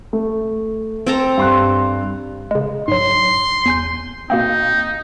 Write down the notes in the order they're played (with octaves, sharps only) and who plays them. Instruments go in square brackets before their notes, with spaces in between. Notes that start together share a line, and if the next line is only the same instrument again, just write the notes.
[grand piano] A3
[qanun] C4 A4 A#5
[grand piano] G2 C6 F#6
[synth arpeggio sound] C#3 G#3
[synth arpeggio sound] G#2 F#3 [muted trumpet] C6
[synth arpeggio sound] E2 G#5 G6
[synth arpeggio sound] B2 A#3 C4 [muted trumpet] D#4